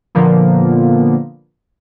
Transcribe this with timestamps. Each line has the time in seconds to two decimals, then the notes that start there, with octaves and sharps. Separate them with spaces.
0.15 A#2 D3 F3 A#3 B3